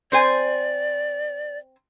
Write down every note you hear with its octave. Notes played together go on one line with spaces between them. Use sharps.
C4 C5 D5 G#5